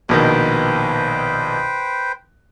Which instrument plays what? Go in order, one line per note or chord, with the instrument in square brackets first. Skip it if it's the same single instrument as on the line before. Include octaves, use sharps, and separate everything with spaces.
[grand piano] A#1 B2 D#3 [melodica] B4 C5 G5